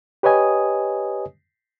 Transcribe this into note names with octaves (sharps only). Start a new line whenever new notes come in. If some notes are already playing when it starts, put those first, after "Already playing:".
G4 B4 C#5 D#5 G#5 D#6